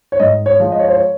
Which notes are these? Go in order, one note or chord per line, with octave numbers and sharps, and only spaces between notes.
C#5
G#2 D#5
C#5
F3 G#3
D#5
C#5
C5
C#5